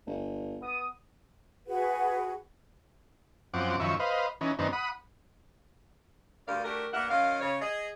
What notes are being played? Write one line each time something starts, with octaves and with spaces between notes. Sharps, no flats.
G1
B3 D#6
F#4 G#4 B4 F#5
F#2 F3 C4 F#5 D6
F#2 D#3 F3 E5 C#6
B4 C5 D#5 F5
E3 C#4 D#4
F#2 D#3 B3 C4 D4 D#4
F#5 B5 D#6
D2 G2 G4 A#4 D5 F5
A3 D4 F#4 G4 A#4
G2 A#3 A#4 E5 F#5
F#2 D#3 A#4 D#5 F5
C#3 C#5
G#4 D#5